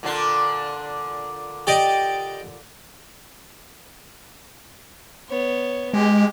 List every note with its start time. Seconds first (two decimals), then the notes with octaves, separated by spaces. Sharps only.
0.03 A#2 D3 D4
1.67 G4 D5 D#5
5.29 B3 C#5
5.94 G#3 G4